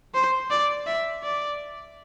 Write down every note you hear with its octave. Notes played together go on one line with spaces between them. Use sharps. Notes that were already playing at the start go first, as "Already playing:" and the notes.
C5
D5
E5
D5